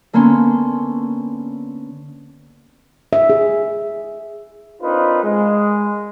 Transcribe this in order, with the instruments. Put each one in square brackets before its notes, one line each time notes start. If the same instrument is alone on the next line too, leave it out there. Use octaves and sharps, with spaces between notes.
[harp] D3 A#3 B3 C#4 C6
[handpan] E5
G#4
[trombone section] C4 D4 D#4 F4 A#4 B4
G#3